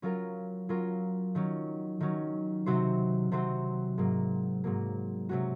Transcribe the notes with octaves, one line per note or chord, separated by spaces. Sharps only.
F#3 C#4 F4 A#4
F#3 C#4 F4 A#4
D#3 F#3 C#4
D#3 F#3 C#4
C3 F#3 C4 F#4 C5
C3 F#3 C4 F#4 C5
G#2 F#3 A#3
G#2 F#3 A#3
C3 F#3 C#4 F#4